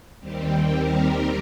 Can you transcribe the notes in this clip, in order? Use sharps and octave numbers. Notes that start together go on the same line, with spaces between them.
D#2 D#3 G3 C4 G4
A#4